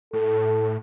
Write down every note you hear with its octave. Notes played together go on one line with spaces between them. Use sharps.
A2 A4